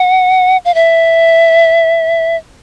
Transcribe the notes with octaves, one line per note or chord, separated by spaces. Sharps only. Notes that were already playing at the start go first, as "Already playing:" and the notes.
Already playing: F#5
F5
E5